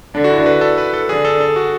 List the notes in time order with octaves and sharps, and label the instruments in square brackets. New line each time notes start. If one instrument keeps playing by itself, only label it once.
[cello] D3 [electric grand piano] D4
[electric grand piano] F#4
E4
B4
A4
B4
A4
[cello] D3 [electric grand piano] G#4
[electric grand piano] A4
A4
F#4